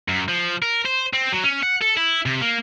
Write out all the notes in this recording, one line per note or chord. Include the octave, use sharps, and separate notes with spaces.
F#2
F3
A#4
C5
C4
F#3
C#4
F#5
A4
E4
C3
A#3